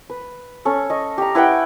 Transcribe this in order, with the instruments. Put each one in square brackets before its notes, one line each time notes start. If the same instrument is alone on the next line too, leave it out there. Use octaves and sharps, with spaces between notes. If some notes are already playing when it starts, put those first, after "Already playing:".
[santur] B4
C#4 A4
D#5 C#6
G4 A#5
E4 B4 F#5 G5